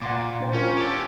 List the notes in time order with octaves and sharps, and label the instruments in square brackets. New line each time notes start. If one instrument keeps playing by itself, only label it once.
[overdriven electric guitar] A#2 [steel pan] F#5 C6 D6
[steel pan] D4 C5 G5
[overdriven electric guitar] C#4 [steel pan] F4 A#4
[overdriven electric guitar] G4 A4